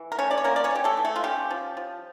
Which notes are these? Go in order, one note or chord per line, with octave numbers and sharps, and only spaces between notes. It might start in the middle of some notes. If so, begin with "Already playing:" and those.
Already playing: E3
A#4
A3 C#4 C#5
D5
C#5
A#3 C#4 A#4
D5
C#4 C#5
C#3 G4
A3 A4
E3
A3 A4
F4
G3 C#4 G4
F3
F3